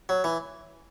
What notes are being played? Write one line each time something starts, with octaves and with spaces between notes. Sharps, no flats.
F#3
E3